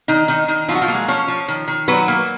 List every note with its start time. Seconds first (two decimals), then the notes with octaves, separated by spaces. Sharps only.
0.08 D#3 D#4
0.28 D#3 D#4
0.48 D#3 D#4
0.69 F3 F#3 F4
0.75 F#4
0.82 F3 F4
0.88 A#3
0.95 G#3 G#4
1.08 F3 C#4 C#5
1.28 F3
1.48 D#3
1.68 D#3
1.88 F#3 B3 B4
2.08 A#3